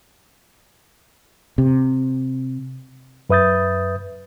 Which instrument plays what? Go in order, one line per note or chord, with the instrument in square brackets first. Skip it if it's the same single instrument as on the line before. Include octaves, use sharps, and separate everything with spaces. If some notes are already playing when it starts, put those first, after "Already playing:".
[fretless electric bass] C3
[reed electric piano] F#2 B4 E5 D#6 G6 A6